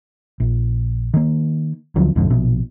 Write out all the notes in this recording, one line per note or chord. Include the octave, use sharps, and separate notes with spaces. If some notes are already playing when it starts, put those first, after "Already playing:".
A#1
D#3 A#3
D2 D3 F3 F#3
B1 F2 G#2 D3
A#1 B2